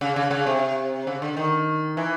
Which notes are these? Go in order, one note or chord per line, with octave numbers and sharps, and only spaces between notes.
C#3
C#3
C#3
C3
C#3
D3
D#3
E3